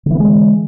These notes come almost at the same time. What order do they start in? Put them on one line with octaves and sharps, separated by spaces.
D3 E3 B3 G#3